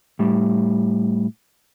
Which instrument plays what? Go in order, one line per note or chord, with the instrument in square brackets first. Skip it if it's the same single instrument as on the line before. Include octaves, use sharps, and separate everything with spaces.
[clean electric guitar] A2 G3